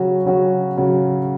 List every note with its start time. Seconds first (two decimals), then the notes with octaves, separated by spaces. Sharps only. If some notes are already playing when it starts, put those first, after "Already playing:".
Already playing: C#3 F#3 C#4 F#4
0.25 C#3 F#3 C#4 F#4
0.77 C#3 F#3 C#4 F#4